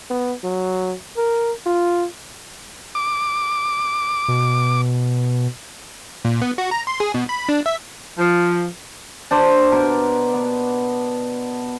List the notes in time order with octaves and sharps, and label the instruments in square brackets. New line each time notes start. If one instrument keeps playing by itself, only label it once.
[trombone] B3
F#3
A#4
F4
[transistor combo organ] D6
[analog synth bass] B2
[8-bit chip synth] A#2
B3
F#4
A#5
C6
G#4
B2
B5
D4
E5
[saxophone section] F3
[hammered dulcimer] D4 C5
B2 A#4
B3